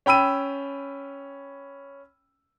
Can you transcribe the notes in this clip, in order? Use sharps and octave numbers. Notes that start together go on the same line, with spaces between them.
C#4 G5 B5 E6 D#7